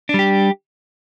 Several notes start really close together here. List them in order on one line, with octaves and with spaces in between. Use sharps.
D4 G3 G4